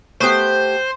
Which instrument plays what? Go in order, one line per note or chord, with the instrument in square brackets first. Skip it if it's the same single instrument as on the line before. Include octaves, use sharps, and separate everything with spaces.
[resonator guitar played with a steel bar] A3 B3 G4 [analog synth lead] C5